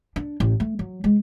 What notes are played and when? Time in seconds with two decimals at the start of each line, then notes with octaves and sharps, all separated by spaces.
0.16 D4
0.40 A1
0.60 A3
0.79 F#3
1.04 G#3